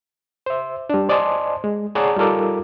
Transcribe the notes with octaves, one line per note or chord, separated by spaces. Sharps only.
C5 E5
G3 D4
C5 D5 D#5 G#5 A5 C6
G#3
G#4 C#5 D5 F#5 A5 A#5
G3 D#4 F4 A4 A#4 D6